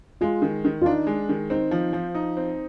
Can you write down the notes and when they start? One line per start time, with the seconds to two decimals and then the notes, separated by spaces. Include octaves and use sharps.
0.21 G#3 F4
0.42 D#3
0.65 D#3
0.82 F4
0.85 D4 D#4
1.07 G#3
1.29 D#3
1.50 C4 D#4
1.71 F3
1.93 F3
2.15 D#4
2.37 C4